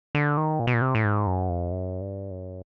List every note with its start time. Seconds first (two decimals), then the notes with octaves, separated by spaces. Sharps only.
0.15 D3
0.37 D#3
0.59 A#2
0.67 B2
0.74 A#2
0.81 C3
0.95 A2
1.04 G#2
1.27 F#2
1.49 F2
1.72 F#2
2.01 G2
2.31 F#2